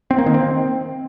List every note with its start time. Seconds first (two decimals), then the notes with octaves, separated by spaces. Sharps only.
0.11 C4
0.18 A#3
0.26 D#3
0.34 C4